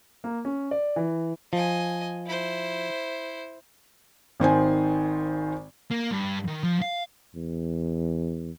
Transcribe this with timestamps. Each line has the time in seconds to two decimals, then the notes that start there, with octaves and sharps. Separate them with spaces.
0.24 A#3
0.45 C#4
0.71 D5
0.96 E3
1.53 F3 D#5 G#5
2.27 E4 C5
4.40 G#1 D#3 C5 G#5
5.91 A#3
6.12 G2
6.48 D#3
6.63 F3
6.82 F5
7.36 E2